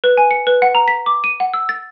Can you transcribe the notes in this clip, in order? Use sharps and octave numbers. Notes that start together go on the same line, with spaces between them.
B4
G#5
C#7
B4
F#5
A#5
B6
D6
D#7
F#5
E6
A6